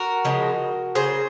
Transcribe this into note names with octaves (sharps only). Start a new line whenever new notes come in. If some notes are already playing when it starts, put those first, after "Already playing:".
Already playing: F#4 A#4
C#3 F3 G#3
C#3 F#3 G#4 C5